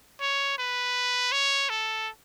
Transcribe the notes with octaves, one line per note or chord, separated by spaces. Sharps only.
C#5
B4
C#5
A4